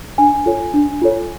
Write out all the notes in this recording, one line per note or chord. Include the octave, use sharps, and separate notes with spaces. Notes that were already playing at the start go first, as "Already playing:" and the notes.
D4 G#5
F4 A4 C#5
D4
F4 A4 C#5